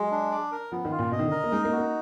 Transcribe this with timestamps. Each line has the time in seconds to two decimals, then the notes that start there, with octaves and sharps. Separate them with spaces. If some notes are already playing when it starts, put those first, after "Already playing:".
Already playing: F#3 G#3
0.11 D4
0.31 D5
0.52 A#4
0.72 F3 B3
0.85 D#3
0.91 F4
0.99 A#2
1.11 B2 D#5
1.19 D#3
1.25 D3
1.31 A#4
1.44 A#3
1.52 G#3 D#4
1.65 A#3
1.72 F#4
1.78 A#3